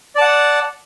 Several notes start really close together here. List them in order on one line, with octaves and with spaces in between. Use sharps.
D5 A5 F#5